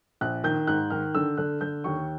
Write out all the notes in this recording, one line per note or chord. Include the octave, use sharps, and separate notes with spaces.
A#1 F#6
D#3 G6
G#2 F#6
D#3 F6
D3 E6
D3 F#6
D3 G6
D#2 C#6